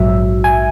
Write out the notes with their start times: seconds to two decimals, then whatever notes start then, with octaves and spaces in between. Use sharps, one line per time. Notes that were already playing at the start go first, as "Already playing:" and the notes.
Already playing: A#1 G#2 F#3 E5
0.44 G#5